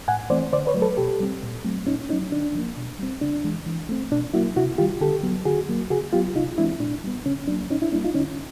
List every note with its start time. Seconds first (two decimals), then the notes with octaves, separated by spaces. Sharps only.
0.08 A2 F#5 G#5
0.30 E3 A3 C4 C5 D5
0.53 D3 C5 D5
0.67 B4 C#5
0.74 F#3 A3
0.82 A4 B4
0.97 B2 G4 A4
1.20 G3 C4
1.43 A#2
1.65 F#3 A3 C4
1.87 A#2 C#4 D#4
2.09 F#3 A3 C#4 D#4
2.32 D3 D4
2.55 F3 A#3
2.77 B2
2.99 G3 C4
3.21 C#3 D4
3.44 E3 G#3
3.67 E3
3.89 A3 C4
4.12 B2 D4
4.34 F#3 A#3 E4 F#4
4.56 C3 E4 F#4
4.78 D#3 G3 F4 G4
5.01 D3 G4 A4
5.23 F#3 B3
5.45 D3 F#4 G#4
5.69 F#3 A#3
5.90 C#3 F#4 G#4
6.13 F#3 B3 F4 G4
6.35 C3 D#4 F4
6.58 E3 G#3 C4 D4 E4
6.80 A#2 D4
7.04 G3 B3
7.26 C#3 C#4
7.47 F#3 A#3 D4
7.70 A#2 C#4 D#4
7.81 D4 E4
7.92 G3 A#3 D4 E4
8.05 D#4 F4
8.15 D3 C#4 D#4